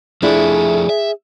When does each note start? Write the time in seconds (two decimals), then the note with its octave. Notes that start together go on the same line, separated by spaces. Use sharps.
0.22 F2 F3 A3 D4 E4 G#4
0.89 E5